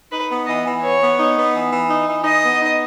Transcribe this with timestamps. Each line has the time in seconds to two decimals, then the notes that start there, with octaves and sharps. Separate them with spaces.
0.11 D#4 B4
0.29 B3
0.46 E3 D#5
0.65 E3
0.82 B3 C#5
1.00 B3
1.17 D#4
1.36 B3
1.54 E3
1.71 E3
1.89 D#4
2.07 E3
2.24 D#4 D#5
2.43 B3
2.61 D#4